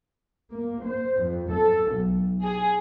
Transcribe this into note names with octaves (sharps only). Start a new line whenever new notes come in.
A#3
C5
F2
A4
B1
G#4